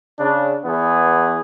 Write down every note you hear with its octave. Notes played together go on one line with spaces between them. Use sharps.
C#3 D4
E2 E3 B3 G#4